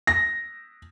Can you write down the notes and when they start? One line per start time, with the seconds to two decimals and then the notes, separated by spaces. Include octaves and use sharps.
0.07 A#6